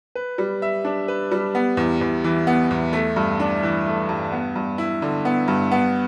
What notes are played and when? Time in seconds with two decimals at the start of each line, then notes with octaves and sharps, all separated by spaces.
0.15 B4
0.38 G3
0.62 E5
0.85 D4
1.08 B4
1.32 G3
1.55 B3
1.77 E2
2.01 E2
2.24 E3
2.47 B3
2.71 E2
2.93 A3
3.16 G2
3.40 D4
3.63 E3
3.86 A3
4.09 G2
4.32 B3
4.55 G2
4.78 E4
5.02 D3
5.25 B3
5.48 G2
5.72 B3